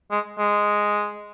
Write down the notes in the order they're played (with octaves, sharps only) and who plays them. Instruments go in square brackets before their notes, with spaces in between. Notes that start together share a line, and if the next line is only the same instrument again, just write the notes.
[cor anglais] G#3
G#3